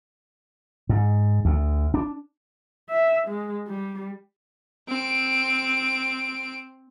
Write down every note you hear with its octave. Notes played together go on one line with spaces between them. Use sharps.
G#2
D2
D4
E5
G#3
G3
C4 D7